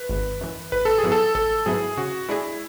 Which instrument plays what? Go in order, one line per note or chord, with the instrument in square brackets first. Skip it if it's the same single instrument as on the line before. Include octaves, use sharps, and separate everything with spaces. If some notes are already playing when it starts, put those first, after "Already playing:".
Already playing: [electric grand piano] B4
[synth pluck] G#1
F#2 E3
[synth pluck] A1 [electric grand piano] B4
[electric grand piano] A4
G#4
[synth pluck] G#2 F#3 B3 E4
[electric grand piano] A4
[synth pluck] A1 [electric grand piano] A4
[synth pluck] G#2 F#3 B3 E4 [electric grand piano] G#4
[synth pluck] C#3 [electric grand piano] F#4
[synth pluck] G#3 D4 G#4 [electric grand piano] E4